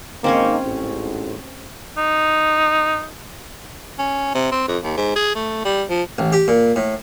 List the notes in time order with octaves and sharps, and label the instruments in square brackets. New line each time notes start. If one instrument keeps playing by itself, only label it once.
[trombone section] G#1 A#3 D#4 [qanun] C4 C#4 C#5
[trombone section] A1 G#2
[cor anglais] D#4
[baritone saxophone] C#4
C3
C4
F2
D#2
G#2
G#4
A3
G3
F3
[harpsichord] A1
G4
A#2
A2